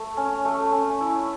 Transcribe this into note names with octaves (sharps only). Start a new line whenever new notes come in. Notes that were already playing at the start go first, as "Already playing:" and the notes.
Already playing: A3
C#4
A3
C#4
E4